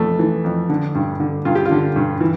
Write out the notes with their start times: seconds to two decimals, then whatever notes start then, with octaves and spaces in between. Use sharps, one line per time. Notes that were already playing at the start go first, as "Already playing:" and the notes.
Already playing: F2 E3 A3
0.19 E3
0.44 F2
0.69 D3
0.95 G2
1.20 D3
1.45 G2 F4
1.55 G4
1.65 F4
1.71 D3
1.96 G2
2.21 E3